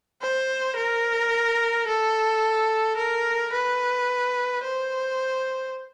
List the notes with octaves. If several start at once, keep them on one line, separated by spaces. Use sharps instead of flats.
C5
A#4
A4
A#4
B4
C5